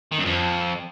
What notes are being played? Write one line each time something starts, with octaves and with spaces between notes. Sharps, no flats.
D#3
F#2
F2